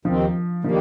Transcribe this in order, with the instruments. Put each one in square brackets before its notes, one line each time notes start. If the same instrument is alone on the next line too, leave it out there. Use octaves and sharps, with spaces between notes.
[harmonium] D#2 D#3 C4 [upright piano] F3
[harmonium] D#3 G3 A#3 [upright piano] F3